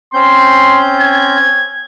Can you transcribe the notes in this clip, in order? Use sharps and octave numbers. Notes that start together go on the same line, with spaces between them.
C4 C#4 C6 G6
G#6